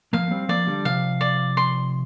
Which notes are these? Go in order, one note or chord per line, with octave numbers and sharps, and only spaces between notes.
F3 A#3 F5
G3 C4
F3 A#3 D5
D3 G3
C3 F3 F5
D5
C6